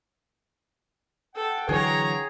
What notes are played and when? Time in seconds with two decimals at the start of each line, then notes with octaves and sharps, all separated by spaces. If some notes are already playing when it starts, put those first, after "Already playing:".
1.36 A4 F#5 G5
1.69 D3 E3 F#3 G#4 C#5 A#5